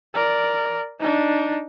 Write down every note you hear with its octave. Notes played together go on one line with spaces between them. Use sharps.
A#4 D5
D4 D#4